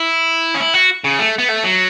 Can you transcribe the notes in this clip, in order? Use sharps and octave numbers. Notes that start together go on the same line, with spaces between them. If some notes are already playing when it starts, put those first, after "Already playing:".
Already playing: E4
C#4
E4
F#4
C#3
A3
B3
A3
F#3